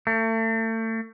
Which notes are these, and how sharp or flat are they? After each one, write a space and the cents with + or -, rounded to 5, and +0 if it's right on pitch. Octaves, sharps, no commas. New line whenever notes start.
A3 +35